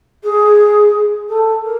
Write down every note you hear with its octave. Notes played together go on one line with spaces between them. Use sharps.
G#4
A4
A#4